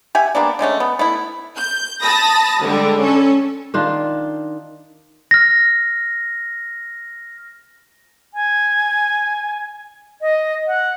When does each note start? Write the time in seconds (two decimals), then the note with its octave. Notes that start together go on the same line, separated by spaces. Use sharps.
0.15 G4 E5 F#5 G#5
0.35 G3 A#3 B3 D4
0.59 D3 G#3 A3 C#4
0.80 B3
0.99 A3 B3 E4
1.57 G6
2.01 A5 B5 D#6 A#6
2.62 D3 G3 G#3
3.00 C#4 A4
3.74 D#3 D4 F4
5.31 F6 A#6
8.34 G#5
10.21 D#5
10.67 F#5